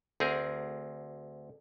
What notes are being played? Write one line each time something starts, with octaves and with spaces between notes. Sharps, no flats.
D2 C4 G#4 A#4